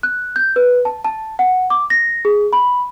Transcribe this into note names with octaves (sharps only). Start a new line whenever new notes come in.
F#6
G6
B4
A5
A5
F#5
D6
A#6
G#4
B5